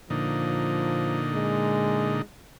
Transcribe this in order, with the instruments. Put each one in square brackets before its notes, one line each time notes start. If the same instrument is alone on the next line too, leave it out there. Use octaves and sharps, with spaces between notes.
[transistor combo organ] A#2 D3 D#4 [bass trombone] F3
[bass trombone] G#3